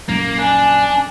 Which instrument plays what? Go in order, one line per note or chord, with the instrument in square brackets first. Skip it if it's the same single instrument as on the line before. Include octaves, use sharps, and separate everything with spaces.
[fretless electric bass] A#1 F#2 [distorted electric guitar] A#3
[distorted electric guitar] D4 [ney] G#5